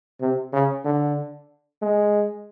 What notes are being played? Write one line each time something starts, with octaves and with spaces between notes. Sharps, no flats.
C3
C#3
D3
G#3